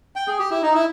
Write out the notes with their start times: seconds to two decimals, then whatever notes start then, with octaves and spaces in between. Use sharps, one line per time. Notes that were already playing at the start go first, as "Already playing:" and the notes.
0.16 G5
0.28 G#4
0.39 G4
0.51 E4
0.63 D#4
0.74 E4